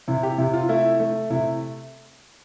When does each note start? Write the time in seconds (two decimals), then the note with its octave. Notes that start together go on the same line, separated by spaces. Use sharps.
0.08 C3 E4
0.23 G4
0.38 C3 E4
0.53 F4
0.69 A3 E4
1.00 A3
1.30 C3 E4